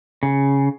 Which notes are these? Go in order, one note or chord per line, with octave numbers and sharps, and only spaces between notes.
C#3